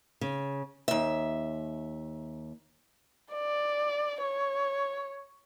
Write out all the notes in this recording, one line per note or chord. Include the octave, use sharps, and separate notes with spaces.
C#3
D#2 E5
D5
C#5